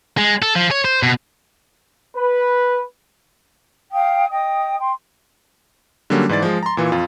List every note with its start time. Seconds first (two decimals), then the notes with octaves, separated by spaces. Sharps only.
0.18 G#3
0.42 A4
0.56 F3
0.71 C#5
0.85 C5
1.03 B2
2.17 B4
3.92 F5 G5 D#6
4.31 D#5 G5 D#6
4.78 G5 C6
6.10 D3 F#3 G3 A#3 C#4
6.29 G#2 E3 D5 A6
6.42 F3 G#3
6.63 A#5 C6
6.77 A#2 E3 F4
6.92 F2 F4